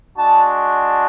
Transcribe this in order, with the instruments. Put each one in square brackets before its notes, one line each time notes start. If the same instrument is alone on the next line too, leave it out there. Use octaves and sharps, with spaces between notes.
[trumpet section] G#3 D4 F#4 A5